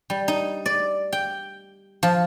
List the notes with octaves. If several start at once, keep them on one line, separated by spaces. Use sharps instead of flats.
G3
D#4
D5
G5
F3